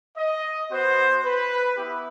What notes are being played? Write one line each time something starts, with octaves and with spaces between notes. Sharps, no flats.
D#5
B3 F#4 C5
B4
B3 E4 G4